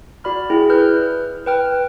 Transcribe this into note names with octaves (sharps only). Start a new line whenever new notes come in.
F#4 D5 B5 F6
E4 G#4 G5
B4 F6 G6
B4 G5 F6